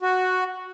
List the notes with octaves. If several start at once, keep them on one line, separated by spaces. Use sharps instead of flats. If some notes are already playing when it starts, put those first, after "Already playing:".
F#4